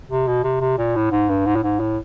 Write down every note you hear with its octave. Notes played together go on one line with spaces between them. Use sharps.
C3
B2
C3
C3
A#2
A2
G#2
G2
G#2
A2
G#2
A2